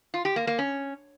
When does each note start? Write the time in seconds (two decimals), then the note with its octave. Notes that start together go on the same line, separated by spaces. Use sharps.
0.14 F4
0.25 G4
0.36 A#3
0.47 A#3
0.59 C#4